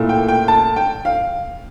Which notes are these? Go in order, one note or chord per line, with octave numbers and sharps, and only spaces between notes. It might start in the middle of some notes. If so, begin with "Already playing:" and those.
Already playing: A#2 A3 E4
G5
G5
A5
G5
F5